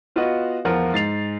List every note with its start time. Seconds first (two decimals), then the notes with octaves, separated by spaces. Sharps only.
0.16 B3 F4 F#4 B4 D#5 F#5
0.65 E2 F3 F4 A#4 F#5
0.93 G#2 A6 C7 F7